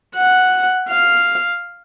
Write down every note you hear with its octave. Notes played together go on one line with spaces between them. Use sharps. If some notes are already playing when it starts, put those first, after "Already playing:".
F#5
F5